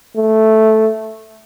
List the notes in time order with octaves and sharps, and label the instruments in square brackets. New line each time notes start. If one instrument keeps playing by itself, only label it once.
[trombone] A3